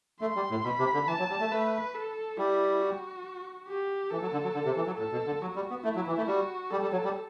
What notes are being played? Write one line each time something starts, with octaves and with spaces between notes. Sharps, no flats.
A3 C6
G3
A2
B2 B5
C3
D3
E3 A5
F#3
G3
A3
A3 B4
A4
G3 E4
F#4
G4
E3 A4
F#3
D3
F#3
D3
C3
E3
F#3
A2 A4
B2
D3
F#3 F#4
G3
B3
A3 E4
F#3
E3
A3
G3 F#4
G3 A4
G3
F#3
G3